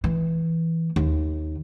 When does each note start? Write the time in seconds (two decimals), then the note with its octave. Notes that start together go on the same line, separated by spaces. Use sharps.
0.04 E3
0.96 D#2